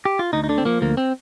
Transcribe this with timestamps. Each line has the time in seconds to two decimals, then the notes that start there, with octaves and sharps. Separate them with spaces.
0.05 G4
0.19 F4
0.33 D2 D#4
0.44 D#4
0.49 D3 D4
0.58 C4
0.65 F3 A#3
0.82 D2 A#3
0.97 C4